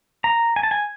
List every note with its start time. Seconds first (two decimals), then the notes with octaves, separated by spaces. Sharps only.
0.24 A#5
0.56 G#5
0.63 A5
0.71 G#5